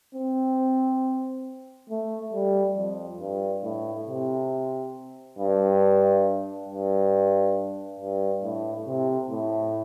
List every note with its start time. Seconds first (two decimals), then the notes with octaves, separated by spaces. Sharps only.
0.15 C4
1.90 A3
2.33 G3
2.76 F2
3.20 G2
3.63 A2
4.07 C3
5.39 G2
6.69 G2
8.00 G2
8.43 A2
8.87 C3
9.30 A2